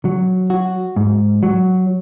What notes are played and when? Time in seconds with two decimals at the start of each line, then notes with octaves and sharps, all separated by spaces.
0.05 F#3
0.50 F#4
0.96 G#2
1.43 F#3